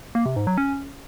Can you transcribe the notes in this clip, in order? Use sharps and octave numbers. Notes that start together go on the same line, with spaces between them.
A#3
C3
G#2
F#3
C#4